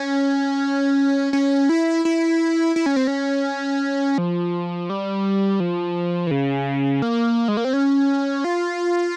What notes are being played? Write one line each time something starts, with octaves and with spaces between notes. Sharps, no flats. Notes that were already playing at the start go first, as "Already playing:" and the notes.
Already playing: C#4
C#4
E4
E4
E4
C#4
C4
C#4
F3
G3
F3
E3
C#3
A#3
G#3
A#3
C4
C#4
F4